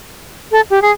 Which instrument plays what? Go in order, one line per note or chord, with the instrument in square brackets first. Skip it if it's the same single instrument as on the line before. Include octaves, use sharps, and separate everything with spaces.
[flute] A4
G4
G#4